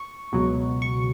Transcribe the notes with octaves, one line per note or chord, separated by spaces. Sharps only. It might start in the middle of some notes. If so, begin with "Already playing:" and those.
Already playing: C#6
C#2 B2 F#3
C#6